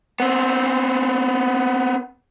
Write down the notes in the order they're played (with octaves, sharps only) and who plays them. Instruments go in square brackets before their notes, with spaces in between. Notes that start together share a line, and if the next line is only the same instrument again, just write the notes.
[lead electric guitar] B3 C4